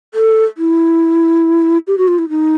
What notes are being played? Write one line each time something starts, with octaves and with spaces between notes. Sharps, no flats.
A4
E4
G4
F#4
F4
E4
D#4